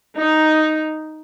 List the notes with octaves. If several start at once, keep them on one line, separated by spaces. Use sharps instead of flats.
D#4